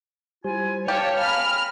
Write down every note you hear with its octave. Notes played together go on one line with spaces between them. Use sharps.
G3 E4 F4 C5 G#5
G4 C#5 F5 A5
G#5 A#5 B5 F6